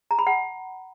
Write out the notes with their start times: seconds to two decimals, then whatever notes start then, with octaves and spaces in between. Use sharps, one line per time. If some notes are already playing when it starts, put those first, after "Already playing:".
0.11 A#5
0.19 B5
0.27 F#5